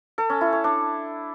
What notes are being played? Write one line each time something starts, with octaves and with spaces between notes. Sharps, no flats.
A4
C#4
E4
C#5
D4